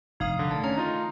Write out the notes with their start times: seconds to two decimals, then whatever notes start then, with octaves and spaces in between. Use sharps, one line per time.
0.20 F1 G2 D#4 F5 D#6
0.39 D3
0.51 D#3 A3 A5
0.64 C#4 A#5
0.77 D#4 F4